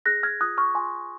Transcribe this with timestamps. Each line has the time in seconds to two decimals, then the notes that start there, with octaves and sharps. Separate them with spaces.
0.06 G#4 F#6 A#6
0.23 F6 G#6
0.41 F4 D#6 F#6
0.58 C#6 F6
0.75 F4 G#5 C6